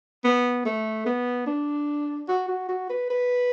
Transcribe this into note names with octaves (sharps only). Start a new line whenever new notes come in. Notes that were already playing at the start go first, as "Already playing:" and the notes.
B3
A3
B3
D4
F#4
F#4
F#4
B4
B4